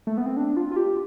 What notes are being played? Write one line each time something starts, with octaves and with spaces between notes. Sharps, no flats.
A3
B3
C4
D4
F4
F4
G4